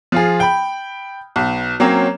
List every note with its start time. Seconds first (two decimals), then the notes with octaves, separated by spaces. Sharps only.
0.12 F3 F4 G#4
0.40 G5 B5
1.36 B1
1.80 F#3 A#3 C4 C#4